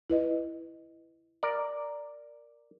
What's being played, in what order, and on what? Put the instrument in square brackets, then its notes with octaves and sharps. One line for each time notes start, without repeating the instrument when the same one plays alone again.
[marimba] E4 B4 D#5
[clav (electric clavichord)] A#4 D5